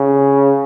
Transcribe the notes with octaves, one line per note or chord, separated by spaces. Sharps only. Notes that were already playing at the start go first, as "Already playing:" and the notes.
Already playing: C#3